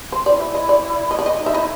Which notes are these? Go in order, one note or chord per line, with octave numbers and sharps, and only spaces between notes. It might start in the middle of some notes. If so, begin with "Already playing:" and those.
C5
E4 D5
E5
D#5
D5
D#5
D5
D#5
D#4
E5
E4 D#5